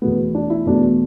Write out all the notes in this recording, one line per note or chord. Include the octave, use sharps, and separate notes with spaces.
E2 B2 A3 B3
D4
E4
E2 B2 A3 D4